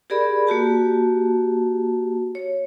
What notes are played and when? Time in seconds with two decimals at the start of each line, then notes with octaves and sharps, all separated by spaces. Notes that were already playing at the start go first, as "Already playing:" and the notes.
0.10 G4 G#4 A#4 D5 B5
0.47 A#3 F#4 G4 A5
2.35 C#5